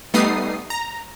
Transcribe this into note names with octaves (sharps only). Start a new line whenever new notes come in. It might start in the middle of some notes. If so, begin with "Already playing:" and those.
G3 A3 B3 D#4 D#6 C7
A#5